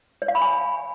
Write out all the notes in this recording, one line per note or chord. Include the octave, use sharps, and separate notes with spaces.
C#5
F5
B5
G#5